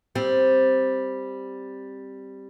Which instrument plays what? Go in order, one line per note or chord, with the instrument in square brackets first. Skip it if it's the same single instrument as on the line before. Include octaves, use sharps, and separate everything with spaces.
[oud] G3 C4